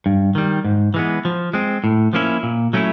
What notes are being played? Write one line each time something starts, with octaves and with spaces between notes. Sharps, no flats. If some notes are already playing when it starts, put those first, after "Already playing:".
G2
D#3 G3
G#2
E3 G#3 B3
F3
G#3 C4
A2
F3 A#3 C#4 E4
A#2
F#3 A3 C#4 E4